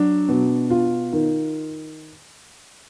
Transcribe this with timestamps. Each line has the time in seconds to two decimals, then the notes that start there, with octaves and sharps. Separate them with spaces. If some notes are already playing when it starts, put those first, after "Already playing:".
Already playing: F#3 D4
0.29 B2
0.70 F4
1.13 D#3